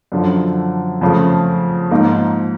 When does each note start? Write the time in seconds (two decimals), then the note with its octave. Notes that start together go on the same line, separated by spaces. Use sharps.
0.12 F#2 D3 F3
1.01 F2 C#3 F3 A3
1.91 G#2 F3 A#3 D#4